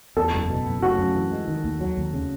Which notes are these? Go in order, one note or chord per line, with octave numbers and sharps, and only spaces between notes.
E2 A4
F#1
B2
F#1
C#3 F#4
F#2
E3
G#3
D#3
D#2
F#3
D#2
C#3